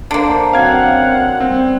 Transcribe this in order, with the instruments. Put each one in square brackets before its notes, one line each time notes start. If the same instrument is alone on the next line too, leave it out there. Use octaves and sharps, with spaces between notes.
[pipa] D3 A#3 [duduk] C5
[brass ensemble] F#2 F#5 [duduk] C4 [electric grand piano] F5 G#6
[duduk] G3 [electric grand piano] C4